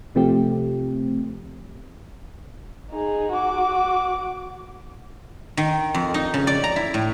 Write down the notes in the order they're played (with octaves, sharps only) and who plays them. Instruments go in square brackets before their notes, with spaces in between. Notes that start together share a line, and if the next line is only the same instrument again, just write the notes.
[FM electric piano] C3 F3 A3 C4 G4
[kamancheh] D#4 G#4
F#4 D6
[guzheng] D#3
F2
D#4
C#3
D5
A#5
E4
A2